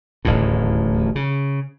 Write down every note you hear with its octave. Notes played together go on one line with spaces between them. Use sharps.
D1 A1 D#2 A2
C#3